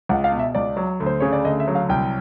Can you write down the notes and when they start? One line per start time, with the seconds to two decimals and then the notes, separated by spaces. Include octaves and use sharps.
0.09 C#2 F#5
0.24 F5
0.32 B2
0.39 E5
0.55 C#2 D5
0.77 F#3
1.00 D2
1.06 C5
1.20 C#3 C#5
1.33 D5
1.45 D2 D#5
1.60 E5
1.68 F#3
1.75 F5
1.89 C2 G5